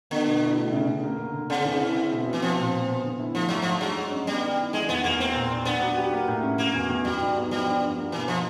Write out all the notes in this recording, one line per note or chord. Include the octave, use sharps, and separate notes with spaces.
D3 B3
B2
E4
A3
C#3
C#3
A#3
D3
D3
C#3 C4
E3
E4
C4
B2
B2
E3
F3 C4
A#2
A#2
B3
D3
E4
F3 A3
G#2 F#3
F3 D4
F#3 G#3
G2
C#4
G3 B3
D#3
E4
D#3 G#3
E2 B3
E2 A#3
A#3 C4
A#2
D4
B3 D4
F#3
G4
A#3
A2
C#4
F#3 A#3
E2
E2
F#3 G3
G#2
B3
F3 G3
G2
G2
A#3
B2 E3
F3 D#4